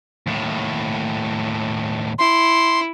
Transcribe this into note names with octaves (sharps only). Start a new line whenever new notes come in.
D#2 A2
E4 C6